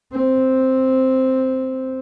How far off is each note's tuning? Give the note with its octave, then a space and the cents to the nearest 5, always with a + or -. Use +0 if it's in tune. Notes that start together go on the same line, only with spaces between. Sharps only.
C4 +0